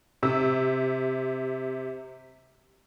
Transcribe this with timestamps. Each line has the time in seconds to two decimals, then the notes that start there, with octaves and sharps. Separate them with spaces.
0.23 C3 E6